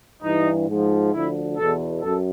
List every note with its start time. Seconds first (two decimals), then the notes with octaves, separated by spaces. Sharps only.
0.22 G2 E3 D#4
0.67 G#2 F3
1.13 D2 D3 F3 E4
1.58 E2 B2 A4
2.01 F#2 A4